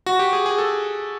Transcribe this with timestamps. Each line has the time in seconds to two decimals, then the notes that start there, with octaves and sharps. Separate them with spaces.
0.06 F#4
0.19 G4
0.33 G#4
0.46 G#4
0.58 A4